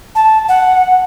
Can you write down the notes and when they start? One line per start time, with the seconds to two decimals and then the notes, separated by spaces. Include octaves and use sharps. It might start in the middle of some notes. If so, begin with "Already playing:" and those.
0.15 A5
0.49 F#5